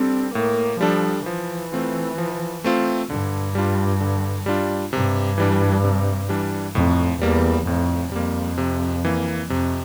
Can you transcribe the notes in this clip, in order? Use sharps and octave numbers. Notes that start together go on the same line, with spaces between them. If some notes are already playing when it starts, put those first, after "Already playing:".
Already playing: G3 C4 D4 A4
A2 A#3
F3 G3 D4 A4
E3 F3
A3 C4 F4
F3
A3 C4 F4
G2 D3
G3 D4 F4
D3
G3 D4 F4
G2 C3
E3 G3 D4
C3
E3 G3 D4
F2 A2
E2 G3 A#3
F2 A2
F2 G3 A#3
C3
E3 A#3
F2 C3